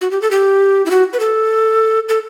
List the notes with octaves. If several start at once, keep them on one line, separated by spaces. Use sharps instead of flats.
F#4
G4
A4
G4
E4
F#4
B4
A4
A4